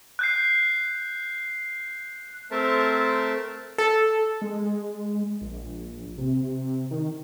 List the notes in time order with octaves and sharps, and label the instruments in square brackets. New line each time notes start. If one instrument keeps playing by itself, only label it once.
[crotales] F#6 G6 C7
[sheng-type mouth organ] A3 C4 A#4 C5 E5 A5
[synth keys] A4
[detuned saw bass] G#3
A#1
C3
D#3